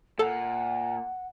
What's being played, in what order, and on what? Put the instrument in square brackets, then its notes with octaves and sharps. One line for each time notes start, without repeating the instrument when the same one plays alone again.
[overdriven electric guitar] A#2 [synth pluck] A4 [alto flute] F#5